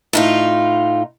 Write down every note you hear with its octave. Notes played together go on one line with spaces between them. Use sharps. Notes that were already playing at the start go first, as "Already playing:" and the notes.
A2 D#4 F4